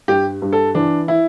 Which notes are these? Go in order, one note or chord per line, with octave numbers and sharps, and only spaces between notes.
G2 G4
G2
A4
E3 D4
E4